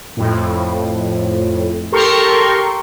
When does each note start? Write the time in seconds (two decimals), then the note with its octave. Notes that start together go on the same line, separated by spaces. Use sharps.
0.17 F2 A2
1.92 G4 A4 A#4 A#5 C6 C#6